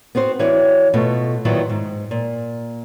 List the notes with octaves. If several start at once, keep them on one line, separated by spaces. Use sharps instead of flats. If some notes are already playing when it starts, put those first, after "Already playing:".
B3 C4 F#4 C5
E3 F#4 C#5 D5
B2 A3 F4
A#2 D#3 F#3 B3 E4 F4
G#2
A#2